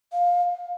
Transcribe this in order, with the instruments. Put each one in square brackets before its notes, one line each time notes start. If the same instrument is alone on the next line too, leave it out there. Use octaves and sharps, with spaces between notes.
[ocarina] F5